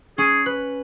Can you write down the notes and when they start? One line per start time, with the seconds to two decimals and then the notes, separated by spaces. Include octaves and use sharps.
0.18 C#4 G#4
0.46 B4